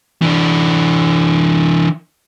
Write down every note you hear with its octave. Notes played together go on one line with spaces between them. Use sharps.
E3 D4